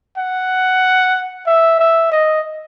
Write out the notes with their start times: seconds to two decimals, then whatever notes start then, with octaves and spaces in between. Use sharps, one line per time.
0.18 F#5
1.46 E5
1.79 E5
2.12 D#5